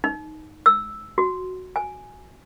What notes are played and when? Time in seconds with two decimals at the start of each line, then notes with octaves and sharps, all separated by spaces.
0.04 D#4
0.66 E6
1.18 F#4
1.76 G#5